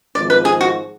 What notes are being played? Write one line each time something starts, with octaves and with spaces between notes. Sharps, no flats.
G#1 G#2 F3 D5
B4
G#4
F#4